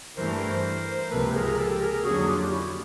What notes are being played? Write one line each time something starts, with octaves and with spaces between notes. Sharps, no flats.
G2 E3 A3 A#4 C5
C#2 C3 F3 A#3 A4 B4
G#4 A#4
G4 A4
G#4 A#4
F2 D3 F#3 A#3 C#4 F#4 G#4
F4 G4
E4 F#4